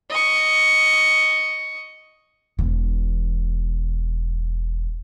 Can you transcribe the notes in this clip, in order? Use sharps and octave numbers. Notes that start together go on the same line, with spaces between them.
D#5 C#6
E1 E3